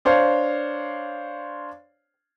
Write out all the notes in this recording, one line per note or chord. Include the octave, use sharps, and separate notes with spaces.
D4 C5 C#5 F5